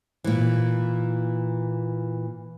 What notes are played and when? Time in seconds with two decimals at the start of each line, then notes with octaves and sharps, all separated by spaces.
0.24 A#2 E3